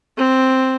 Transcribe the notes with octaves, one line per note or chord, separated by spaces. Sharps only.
C4